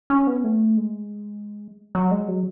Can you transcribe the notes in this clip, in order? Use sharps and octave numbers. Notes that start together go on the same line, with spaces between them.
C#4
B3
A3
G#3
F#3
G#3
F#3